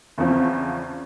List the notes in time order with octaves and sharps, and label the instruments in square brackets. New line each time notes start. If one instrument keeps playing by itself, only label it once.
[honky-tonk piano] E2 C#3 F3 [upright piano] C4